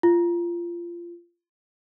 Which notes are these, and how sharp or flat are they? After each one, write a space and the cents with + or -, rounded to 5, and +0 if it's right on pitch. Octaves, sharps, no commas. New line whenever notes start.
F4 -20